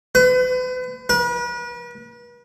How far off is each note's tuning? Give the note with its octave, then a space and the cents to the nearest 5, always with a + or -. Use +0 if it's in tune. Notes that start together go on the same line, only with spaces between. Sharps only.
B4 +40
B4 -40